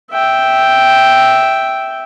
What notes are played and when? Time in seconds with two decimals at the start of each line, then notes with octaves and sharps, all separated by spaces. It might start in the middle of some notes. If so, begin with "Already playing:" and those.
0.11 E5 G5